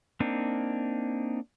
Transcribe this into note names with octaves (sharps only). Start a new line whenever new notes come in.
A#3 C4 D4 D#4